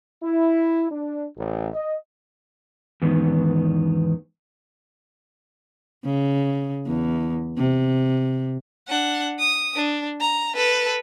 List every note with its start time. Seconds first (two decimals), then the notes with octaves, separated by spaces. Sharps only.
0.23 E4
0.91 D4
1.36 A1
1.74 D#5
3.02 E2 G#2 D#3 B3
6.04 C#3
6.86 E2
7.57 C3
8.88 D4 F#5
9.39 D#6
9.76 D4
10.21 A#5
10.56 A4 B4